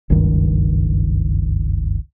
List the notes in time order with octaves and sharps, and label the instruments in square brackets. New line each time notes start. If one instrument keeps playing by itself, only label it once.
[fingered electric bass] F#1 C#2 G2 D#3